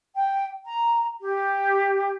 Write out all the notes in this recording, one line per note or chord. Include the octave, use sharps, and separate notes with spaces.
G5
A#5
G4